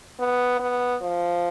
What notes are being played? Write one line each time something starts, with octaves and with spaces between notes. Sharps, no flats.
B3
B3
F3